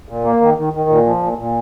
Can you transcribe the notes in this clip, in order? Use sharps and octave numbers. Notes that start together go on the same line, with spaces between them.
A#2
A#3
D#3
D#3
D#3
A#2
F3
A#2
A#2